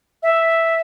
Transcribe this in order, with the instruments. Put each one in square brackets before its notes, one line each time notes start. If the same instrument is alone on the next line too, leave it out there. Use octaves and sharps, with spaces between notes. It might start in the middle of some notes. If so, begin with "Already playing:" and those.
[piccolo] E5